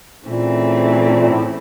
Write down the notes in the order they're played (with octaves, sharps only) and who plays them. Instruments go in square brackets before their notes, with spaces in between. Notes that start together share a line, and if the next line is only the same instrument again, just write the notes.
[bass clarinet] A#2 [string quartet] C#3 E3 A3 C4 E4
[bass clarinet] A#2
A2